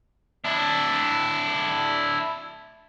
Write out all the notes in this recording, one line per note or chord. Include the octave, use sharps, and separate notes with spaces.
D4 E4